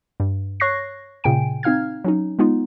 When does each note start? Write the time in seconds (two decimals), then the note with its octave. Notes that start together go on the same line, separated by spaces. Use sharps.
0.20 G2
0.60 C#5 C#6 F#6 A#6 C7
1.24 A#2 C#3 G5 G#5 D7
1.63 C4 D#4 F5 F6 G#6
2.04 F#3 C#4 D#4
2.39 G#3 B3 D#4 F4